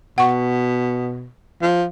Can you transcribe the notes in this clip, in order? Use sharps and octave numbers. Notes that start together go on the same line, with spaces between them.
B2 F#5 C#6
F3